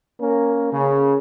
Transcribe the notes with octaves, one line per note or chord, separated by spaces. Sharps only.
A#3 C#4 A#4
C#3